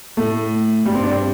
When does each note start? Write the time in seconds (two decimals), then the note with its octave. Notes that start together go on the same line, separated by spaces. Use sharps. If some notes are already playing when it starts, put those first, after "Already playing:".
0.17 A2 A3
0.86 G2 G3
0.94 C4
1.03 D4
1.11 C4